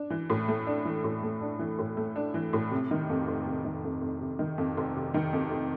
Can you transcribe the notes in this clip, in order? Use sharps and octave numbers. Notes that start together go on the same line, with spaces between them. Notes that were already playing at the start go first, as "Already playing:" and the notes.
Already playing: D4
E3
A2
A3
D4
E3
A2
A3
D4
E3
A2
A3
D4
E3
A2
C3
D#3
F2
F1
C3
D#3
F2
F1
C3
D#3
F2
F1
C3
D#3
F2
F1